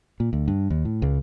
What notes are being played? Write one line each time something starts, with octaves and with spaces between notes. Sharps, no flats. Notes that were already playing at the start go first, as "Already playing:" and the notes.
A#2
D2
G2
D#2
A2
C#2